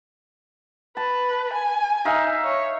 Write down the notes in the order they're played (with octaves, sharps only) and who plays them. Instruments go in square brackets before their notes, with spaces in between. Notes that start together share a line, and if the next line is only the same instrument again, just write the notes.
[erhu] B4 [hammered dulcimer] A5
[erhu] G#5
[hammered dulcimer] D#4 E5 F5
[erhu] C#5